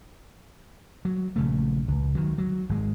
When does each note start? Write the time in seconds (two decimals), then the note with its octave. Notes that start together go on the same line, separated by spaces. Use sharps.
1.05 F#3
1.36 A#1 C#3 A3
1.88 C#2
2.15 D#3 F#3
2.38 F#3
2.69 G#1 G#3